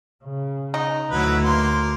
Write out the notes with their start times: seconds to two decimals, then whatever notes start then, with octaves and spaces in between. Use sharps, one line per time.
0.24 C#3
0.74 D#4
1.11 D2 F#3 E4 B4
1.44 A#3 C6